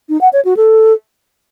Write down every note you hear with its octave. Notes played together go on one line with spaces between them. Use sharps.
D#4
F#5
C#5
F#4
A4